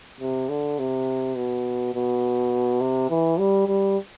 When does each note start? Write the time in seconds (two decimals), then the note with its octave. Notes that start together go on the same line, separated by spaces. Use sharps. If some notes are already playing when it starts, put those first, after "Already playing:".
0.21 C3
0.49 D3
0.79 C3
1.37 B2
1.94 B2
2.81 C3
3.10 E3
3.39 G3
3.67 G3